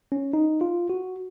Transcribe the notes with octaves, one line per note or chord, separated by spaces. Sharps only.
C#4
D#4
F4
F#4